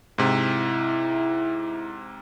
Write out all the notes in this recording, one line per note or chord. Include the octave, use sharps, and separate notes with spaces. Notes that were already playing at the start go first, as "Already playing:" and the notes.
G#2 C3 E4